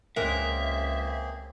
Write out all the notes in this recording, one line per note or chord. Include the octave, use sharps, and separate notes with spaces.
C#2 G#3 A#3 C4 G#4 A#4 E5